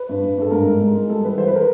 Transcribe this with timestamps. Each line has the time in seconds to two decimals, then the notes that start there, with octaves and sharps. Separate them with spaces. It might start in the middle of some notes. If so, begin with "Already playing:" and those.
Already playing: B4
0.09 G2
0.24 G2
0.38 G2 A4
0.51 G#2 A#4
0.66 G#2
0.81 G#3
0.95 G#3
1.09 G3 A4
1.24 E3 B4
1.38 E3 C5
1.48 B4
1.52 E3 A#4